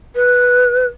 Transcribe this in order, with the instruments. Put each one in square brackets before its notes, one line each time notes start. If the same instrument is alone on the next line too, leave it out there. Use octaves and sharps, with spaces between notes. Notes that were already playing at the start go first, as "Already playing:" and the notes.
[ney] B4